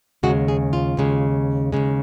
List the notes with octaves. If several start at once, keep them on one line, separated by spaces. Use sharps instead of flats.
D#2 C#3 G#3 F#4
G#4
F4
D#2 C#3 G#3
D#2 C#3 G#3